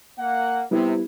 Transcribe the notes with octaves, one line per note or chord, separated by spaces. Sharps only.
A#3 F#5
C3 G3 B3 E4